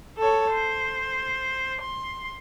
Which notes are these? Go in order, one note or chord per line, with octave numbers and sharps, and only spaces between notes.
A4 C#5
C5
C6